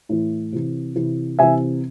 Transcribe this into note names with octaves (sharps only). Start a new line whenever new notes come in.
A2 E3
C3 E3
C3 E3
C3 E3 E5 G#5